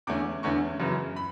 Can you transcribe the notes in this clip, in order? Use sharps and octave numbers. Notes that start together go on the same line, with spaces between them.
E2 D3 A3 C#4 D6
E2 D3 A3 C#4 C#6
F#2 C#3 E3
B5